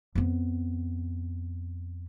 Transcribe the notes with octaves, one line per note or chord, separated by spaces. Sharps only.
F2 B3